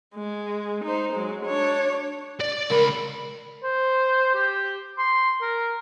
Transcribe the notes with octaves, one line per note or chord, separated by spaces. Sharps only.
G#3
D#4 C5
F#3 G#3
D4 C#5
D5
C#2 A#4 B5
C5
G4
C6
A#4